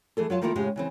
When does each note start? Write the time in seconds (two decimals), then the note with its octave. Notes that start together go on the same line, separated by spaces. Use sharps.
0.17 E3 A3 G#4 A4
0.30 F#3 F4 F5 A5
0.42 D#3 A3 A#3 E4 F4 A#4
0.55 A2 C#3 G#3 G4 G#4
0.76 C#3 E3 C4